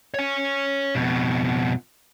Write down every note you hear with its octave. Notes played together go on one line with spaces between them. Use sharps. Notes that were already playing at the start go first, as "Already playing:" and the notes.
C#5 G#5
F2 B2